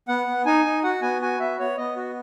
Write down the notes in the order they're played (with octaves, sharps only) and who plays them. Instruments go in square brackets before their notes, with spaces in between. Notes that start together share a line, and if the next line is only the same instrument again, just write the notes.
[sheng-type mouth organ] B3 F#5
B3
D#4 G#5
D#4
F#4 F#5
B3 G#5
F#4 G#5
B3 E5
B3 C#5
B3 D#5
F#4